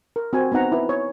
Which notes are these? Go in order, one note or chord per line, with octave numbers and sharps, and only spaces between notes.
A#4
C4 F#4 G#5
B3 C4 D#4 F#5 A#5
E4 B4
C#5